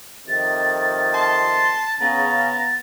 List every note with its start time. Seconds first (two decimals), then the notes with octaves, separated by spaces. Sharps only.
0.27 F2 C3 D#3 A6
1.14 A5 C6
2.01 C#3 B3 A#5